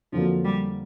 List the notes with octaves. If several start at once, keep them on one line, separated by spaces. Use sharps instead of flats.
F2 D3 F3 F#3 A#3
G3